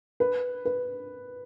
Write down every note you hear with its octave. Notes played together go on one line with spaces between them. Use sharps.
B4
B4